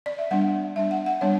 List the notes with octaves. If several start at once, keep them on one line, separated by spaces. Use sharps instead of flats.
D5
E5
G3 B3 D4 F#5
G3 B3 D4 E5
F#5
F#5
G3 B3 D4 C#5